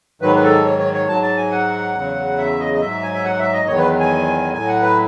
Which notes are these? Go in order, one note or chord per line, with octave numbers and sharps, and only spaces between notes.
G#2 D#3 F#3 B4
B4
A4
C#5
C#5
C#5
G#2 F#3 A5
A5
G#5
F#5
E2 C#3 F#3
E5
D#5
D#5
G#2 F#3 E5
G#5
E5
F#5
E5
D#5
E2 D#3 F#3 C#5
B4
G#5
A2 F#3 G#5
F#5
B4